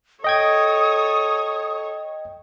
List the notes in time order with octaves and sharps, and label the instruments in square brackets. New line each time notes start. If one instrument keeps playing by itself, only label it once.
[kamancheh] A4 C#5 [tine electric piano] D#5 G5 G#6 [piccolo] D#6